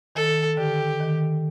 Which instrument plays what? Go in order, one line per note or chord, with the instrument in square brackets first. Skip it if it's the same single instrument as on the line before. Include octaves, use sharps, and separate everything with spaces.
[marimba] D#3 [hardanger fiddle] A4
[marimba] D3 [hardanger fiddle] G4
[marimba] D#3